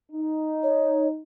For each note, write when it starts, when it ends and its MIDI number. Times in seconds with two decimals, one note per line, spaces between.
0.12 1.22 63
0.63 1.07 73